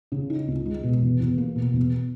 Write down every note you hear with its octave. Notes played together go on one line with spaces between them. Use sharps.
C#3
D#4
C#2
G#3
B2
E2
E2
A#3
B2
E2